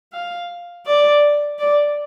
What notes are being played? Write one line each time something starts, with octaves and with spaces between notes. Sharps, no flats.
F5
D5
D5